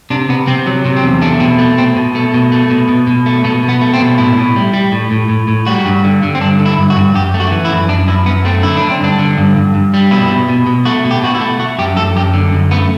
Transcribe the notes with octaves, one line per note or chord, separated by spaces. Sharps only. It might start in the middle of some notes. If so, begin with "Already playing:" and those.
C3 D4
C3 B3
C3 C4
F#3
C3
C4
E2
A3 D4
B2 C4
A3
B2 C4
B2
A3
B2
A3
B2
B2
B2
A3
B2 A3
B2
B3
A3
C4
B2
A2 E4
A2
G3
G3
A2
A2
A2
A2
G3 F#4
G2
D3
D3
C4
G2 D4
D3
E4
G2
F#4
G2
F#2 G4
A3
F#4
E3
E4
F#2
F#2 D4
F#2 E4
F#2 B3
A3 C4
D3 E4
D3 D4
C4
G2 D4
D3
G2
G2
G2
G3
B2 E4
B2
B2
B2
A3 F#4
B2
G4
B2 F#4
E4
A3
A3 F#4
F#2 G4
F#2 A4
F#2 G4
D3
F#2
A3 B3